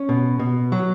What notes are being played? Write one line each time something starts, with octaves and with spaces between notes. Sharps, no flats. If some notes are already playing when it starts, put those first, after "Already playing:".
Already playing: C#4
B2
B2
F#3